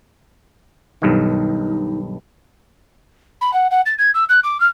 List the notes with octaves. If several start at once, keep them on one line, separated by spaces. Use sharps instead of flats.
B1 G2 D#3 D#4
B5
F#5
F#5
A6
G#6
E6
F#6
D6
F6